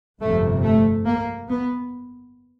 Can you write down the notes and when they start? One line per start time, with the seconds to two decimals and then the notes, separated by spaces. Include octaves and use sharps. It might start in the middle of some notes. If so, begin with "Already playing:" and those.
0.21 G1 F2 C3 A3
0.63 A3
1.06 A#3
1.48 B3